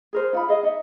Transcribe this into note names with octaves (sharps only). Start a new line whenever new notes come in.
G#4 A#4 C5
D#4 F4 E5 B5
G#4 D#5 F5
D#4 D#5 E5